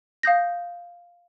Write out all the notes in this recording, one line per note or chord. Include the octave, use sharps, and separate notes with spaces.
F5 D#6 G6 A#6